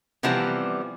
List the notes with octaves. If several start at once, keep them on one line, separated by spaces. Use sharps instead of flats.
C3 E3 F3 G3 B3 C4